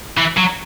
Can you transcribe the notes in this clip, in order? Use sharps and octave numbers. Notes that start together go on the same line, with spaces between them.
E3
F#3